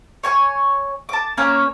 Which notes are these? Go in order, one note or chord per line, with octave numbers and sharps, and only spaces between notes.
C#5 G#5 C#6
A5 D6
A#3 C#4 C#5 D6